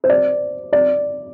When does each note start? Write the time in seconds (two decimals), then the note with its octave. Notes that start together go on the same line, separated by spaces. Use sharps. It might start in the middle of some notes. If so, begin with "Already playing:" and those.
0.04 C5
0.09 D5
0.73 D5